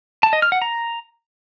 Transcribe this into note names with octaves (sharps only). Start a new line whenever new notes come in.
A5
D#5
F6
F#5
A#5